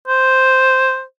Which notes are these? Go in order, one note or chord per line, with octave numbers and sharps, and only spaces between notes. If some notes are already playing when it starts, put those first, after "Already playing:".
C5